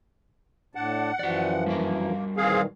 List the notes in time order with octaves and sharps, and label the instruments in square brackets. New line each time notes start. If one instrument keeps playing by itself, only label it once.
[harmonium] A2 D4 A5 [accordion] F#5
[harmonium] F#2 E3 F3 [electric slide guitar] F#4 D5
[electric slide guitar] G3 F#4 A#4 [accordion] A#3
[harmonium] A#2 D#3 E3 [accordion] C4 G#4 F5